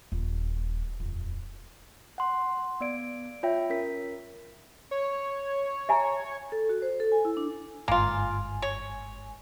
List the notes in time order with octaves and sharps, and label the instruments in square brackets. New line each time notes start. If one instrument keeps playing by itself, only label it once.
[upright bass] D#1
D#1 F2
[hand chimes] F#5 C6
B3 D5 D7
F4 C#5 E5 G5
C#4 A#4 B6
[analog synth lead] C#5
[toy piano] E5 G#5 A#5
[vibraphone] A4
F#4
C5
A4
G#5
E4
D4
[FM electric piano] G1 G#2 G#5 [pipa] A#3 F4
[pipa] C#5